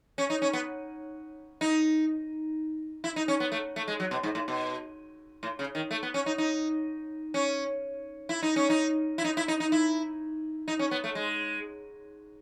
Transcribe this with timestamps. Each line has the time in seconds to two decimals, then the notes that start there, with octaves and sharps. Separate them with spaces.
0.18 C#4
0.30 D#4
0.42 C#4
0.53 B3
1.61 D#4
3.04 E4
3.16 D#4
3.28 C#4
3.40 B3
3.52 A3
3.76 A3
3.88 G#3
4.00 F#3
4.11 B2
4.23 G#2
4.35 A2
4.48 B2
5.43 A2
5.59 C#3
5.75 D#3
5.91 A3
6.03 B3
6.14 C#4
6.26 D#4
6.38 D#4
7.34 C#4
8.29 E4
8.43 D#4
8.56 C#4
8.70 D#4
9.18 E4
9.24 D#4
9.37 E4
9.48 D#4
9.60 D#4
9.72 E4
10.68 D#4
10.79 C#4
10.91 B3
11.04 A3
11.15 G#3